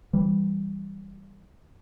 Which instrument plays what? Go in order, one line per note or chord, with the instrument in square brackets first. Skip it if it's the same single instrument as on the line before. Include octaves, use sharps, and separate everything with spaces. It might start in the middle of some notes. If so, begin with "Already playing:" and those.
[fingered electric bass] E3 G3